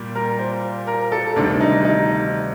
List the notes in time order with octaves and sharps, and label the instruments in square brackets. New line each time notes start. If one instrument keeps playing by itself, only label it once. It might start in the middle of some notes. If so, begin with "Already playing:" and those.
Already playing: [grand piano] A#2 G3 G4
[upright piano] A#4
C5
A#4
A4
[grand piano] D2 C3 D#3 G3 [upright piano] D4
[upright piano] D#4
D#4